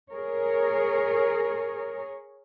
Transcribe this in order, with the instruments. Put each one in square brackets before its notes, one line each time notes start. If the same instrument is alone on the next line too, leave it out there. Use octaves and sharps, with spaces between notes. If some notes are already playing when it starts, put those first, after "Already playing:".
[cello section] G#4 A#4 C#5